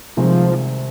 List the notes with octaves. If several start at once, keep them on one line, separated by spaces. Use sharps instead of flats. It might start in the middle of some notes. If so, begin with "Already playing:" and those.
C2 C3 D#3 F3 G#3 C4